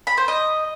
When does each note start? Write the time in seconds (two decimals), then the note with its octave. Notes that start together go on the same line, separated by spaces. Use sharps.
0.07 B5
0.17 C5
0.28 D#5